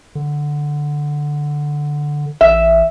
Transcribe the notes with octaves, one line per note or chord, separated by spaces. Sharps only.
D3
A1 E5